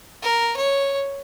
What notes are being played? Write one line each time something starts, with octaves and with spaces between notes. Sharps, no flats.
A#4
C#5